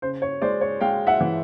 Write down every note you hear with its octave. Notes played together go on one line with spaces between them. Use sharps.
C#3 C5
C#5
G#3 C5 D5
C#5
G#3 F5 G5
E5 F#5
E3